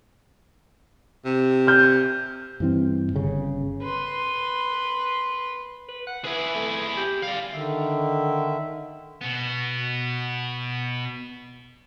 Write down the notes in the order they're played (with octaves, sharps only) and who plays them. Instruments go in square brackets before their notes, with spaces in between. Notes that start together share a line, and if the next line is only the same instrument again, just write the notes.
[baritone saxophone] C3
[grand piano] F6 G6
[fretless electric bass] G2 E3 C4
G1 C#3
[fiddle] B4 C6
[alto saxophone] B4
F#5
[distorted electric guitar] E4 G#4 [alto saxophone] B4
[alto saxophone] A3
G4
[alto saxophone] G3 [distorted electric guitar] D5 F5
[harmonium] D3 D#3 E5
[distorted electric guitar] B2 B3